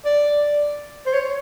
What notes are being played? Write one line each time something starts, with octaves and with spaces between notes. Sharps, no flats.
D5
C5
C#5